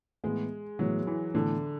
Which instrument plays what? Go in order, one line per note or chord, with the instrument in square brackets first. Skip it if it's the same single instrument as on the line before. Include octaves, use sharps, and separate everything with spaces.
[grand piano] A2 E3 B3 [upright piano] G#3
[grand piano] A2 E3 B3 [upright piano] F#3
[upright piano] E3
[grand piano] A2 E3 B3 [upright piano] D3